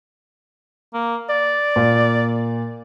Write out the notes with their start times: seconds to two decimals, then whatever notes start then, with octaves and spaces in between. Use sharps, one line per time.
0.94 A#3
1.30 D5
1.76 A#2